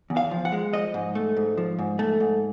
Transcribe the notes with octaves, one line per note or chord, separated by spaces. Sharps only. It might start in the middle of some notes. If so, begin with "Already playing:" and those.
E2
F5
F3
F#5
G#3
F3 D#5
G#2
A3
G#2
F3
G#2
A3
G#2